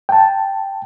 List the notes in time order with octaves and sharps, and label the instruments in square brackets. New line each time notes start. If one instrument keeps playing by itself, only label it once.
[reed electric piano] G5 A5